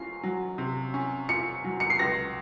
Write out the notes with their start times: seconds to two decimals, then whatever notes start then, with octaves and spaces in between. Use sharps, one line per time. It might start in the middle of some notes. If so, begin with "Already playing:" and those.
Already playing: C#4 F4 C7
0.23 F#3
0.58 C3
0.94 C#4
1.29 F4 C#7
1.64 F#3
1.80 C#7
1.90 C7
1.99 C#2 A#6